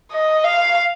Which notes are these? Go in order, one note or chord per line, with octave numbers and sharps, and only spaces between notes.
D#5
F5